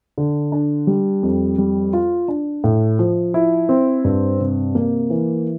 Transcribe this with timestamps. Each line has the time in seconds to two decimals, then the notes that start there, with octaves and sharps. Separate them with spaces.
0.18 D3
0.52 D4
0.87 G3
1.23 F2
1.58 G3
1.93 F4
2.28 D4
2.64 A2
2.99 F3
3.34 E4
3.69 C4
4.04 G2
4.40 C3
4.75 A#3
5.10 E3